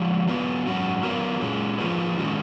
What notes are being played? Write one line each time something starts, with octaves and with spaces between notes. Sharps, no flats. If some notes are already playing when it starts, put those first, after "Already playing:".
Already playing: F3 G#3 F#4
F#3 B3 F4 B4
G#2 F#3 C#4 F#4
F#3 B3 F4 A#4
A#2 G#3 C#4
F3 A#3 F4 G#4 B4
G#2 D#3 G#3 C#4 F#4